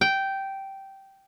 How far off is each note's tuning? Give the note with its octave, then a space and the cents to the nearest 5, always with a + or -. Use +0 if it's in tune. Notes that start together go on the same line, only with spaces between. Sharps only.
G5 -10